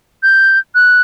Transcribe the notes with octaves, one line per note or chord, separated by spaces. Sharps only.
G6
F#6